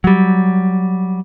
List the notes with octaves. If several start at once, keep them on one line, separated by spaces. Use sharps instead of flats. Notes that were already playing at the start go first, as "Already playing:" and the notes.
F#3 G3